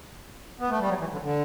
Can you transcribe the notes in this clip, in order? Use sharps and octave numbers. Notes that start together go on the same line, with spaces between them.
B3
A3
G3
F#3
E3
D3
D3